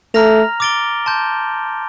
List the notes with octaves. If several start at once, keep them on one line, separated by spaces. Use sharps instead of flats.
A3 A#5 F6 A#6 F7
D6 A6 D7 G7
A5 C6 G6